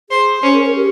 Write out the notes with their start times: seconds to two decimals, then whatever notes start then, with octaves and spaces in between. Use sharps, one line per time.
0.10 G#4 C5
0.43 C#4 C5
0.54 A#4
0.66 A#4
0.76 G4